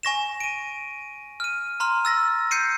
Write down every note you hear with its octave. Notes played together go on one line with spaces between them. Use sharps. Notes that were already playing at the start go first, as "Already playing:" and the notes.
G#5 C#6 A#6 E7
D7 D#7
F6 D#7
A#5 C6 F6
E6 A6 A#6
G6 C7 C#7 D#7